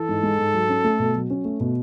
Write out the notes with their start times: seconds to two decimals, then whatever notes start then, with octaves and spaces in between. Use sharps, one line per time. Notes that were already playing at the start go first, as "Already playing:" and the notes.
Already playing: E3 A4
0.09 G#2
0.23 G#3
0.39 G#2
0.54 F#3
0.69 C#4
0.84 A3
1.00 B2
1.15 F#3
1.30 C#4
1.45 A3
1.60 B2